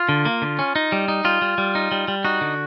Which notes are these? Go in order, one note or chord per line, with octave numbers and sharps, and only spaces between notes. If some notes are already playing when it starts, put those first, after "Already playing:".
Already playing: F4
D3
A#3
D3
C#4
D#4
G3
D#4
G3 F4
G3
G3
D#4
G3
G3
D#4 F#4
D3